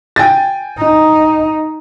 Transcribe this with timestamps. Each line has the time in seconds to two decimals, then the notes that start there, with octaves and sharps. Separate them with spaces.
0.16 G5 G#5 A6
0.79 D#4